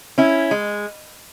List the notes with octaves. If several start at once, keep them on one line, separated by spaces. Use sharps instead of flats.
C#4 E4
G#3